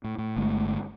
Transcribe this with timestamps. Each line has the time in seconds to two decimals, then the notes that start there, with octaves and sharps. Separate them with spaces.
0.04 A2
0.18 A2
0.36 G1 D3 G#3 A3